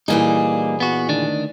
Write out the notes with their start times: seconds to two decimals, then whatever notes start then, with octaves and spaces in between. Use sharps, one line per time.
0.08 A#2 E3 G3 A#3 D#4 G#4
0.80 B3 F#4
1.09 D2 D#3 D4